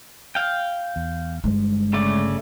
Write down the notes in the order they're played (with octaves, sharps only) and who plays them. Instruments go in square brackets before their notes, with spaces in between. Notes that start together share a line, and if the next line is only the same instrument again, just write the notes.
[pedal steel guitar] F5 G5
[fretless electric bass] E2
[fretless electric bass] G1 G2 [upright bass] G#3
[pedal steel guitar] C#3 A3 D5